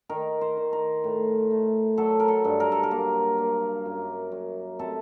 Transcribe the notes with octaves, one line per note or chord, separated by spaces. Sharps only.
D#3 A#4
C5
D#3
A#4
A2
A3
F#3 A4
A#4
A4
G2
A#4
A4
A#4
A#3
A#3
F#2
F#2
C3 A4